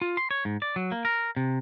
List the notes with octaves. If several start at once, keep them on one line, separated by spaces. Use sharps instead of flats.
F4
C6
C#5
G#2
D5
F#3
A#3
A#4
C3